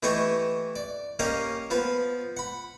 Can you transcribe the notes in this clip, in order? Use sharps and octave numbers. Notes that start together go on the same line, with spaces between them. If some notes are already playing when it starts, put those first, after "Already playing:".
E3 A3 E4 G4 D#5 C#6
D5
A#3 C#4 G4 C#5 D#5
F3 B3 B4
F#5 B5